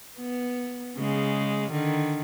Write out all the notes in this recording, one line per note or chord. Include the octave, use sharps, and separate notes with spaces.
B3
C#3 G#3
D3 D#3